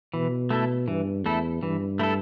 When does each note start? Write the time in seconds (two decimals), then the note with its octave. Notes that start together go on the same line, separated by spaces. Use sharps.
0.14 B2 E3
0.50 A3 E4 A4
0.88 G2 E3
1.25 E2 A3 E4 A4
1.62 G2 E3
1.99 A3 E4 A4